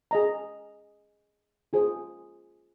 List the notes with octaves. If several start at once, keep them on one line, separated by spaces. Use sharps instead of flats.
G#4 D#5 A#5
F4 G#4 C5